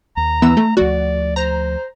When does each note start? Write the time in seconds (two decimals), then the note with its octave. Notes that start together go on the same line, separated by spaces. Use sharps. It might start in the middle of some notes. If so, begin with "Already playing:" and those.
0.17 D#2 A#5
0.42 E3 B3 E6
0.57 A3
0.77 D2 F3 A3 F#4 D5
1.36 C5 A#5